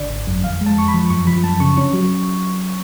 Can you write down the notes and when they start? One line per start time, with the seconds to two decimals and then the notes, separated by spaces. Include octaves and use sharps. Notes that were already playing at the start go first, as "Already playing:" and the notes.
Already playing: G#1 D3 D5
0.10 G#1
0.27 F#2
0.44 F2 F5
0.61 G#3
0.66 A5
0.77 F2 C#6
0.88 B5
0.94 F3
1.10 F#2 C#6
1.27 F3 B5
1.44 F#2 A5
1.60 C#3 C#6
1.77 C#4 C#6
1.93 F#3